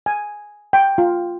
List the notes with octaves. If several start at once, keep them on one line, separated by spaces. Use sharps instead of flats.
G#5
G5
F4